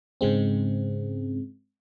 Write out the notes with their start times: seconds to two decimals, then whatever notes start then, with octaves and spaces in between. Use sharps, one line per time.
0.21 G#2 C#3 G#3 C4